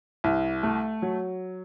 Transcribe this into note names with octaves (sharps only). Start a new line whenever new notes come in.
C2
A3
F#3